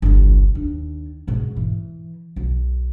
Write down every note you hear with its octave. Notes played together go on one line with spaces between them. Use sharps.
G1 C2
D#2 D4
G#2 B2
E3
B1